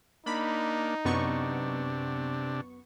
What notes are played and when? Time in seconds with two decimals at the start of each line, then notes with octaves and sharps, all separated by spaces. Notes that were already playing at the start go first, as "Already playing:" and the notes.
0.26 A#3 D4 D#4 B5
1.05 F#2 C3 B3 D4 C#6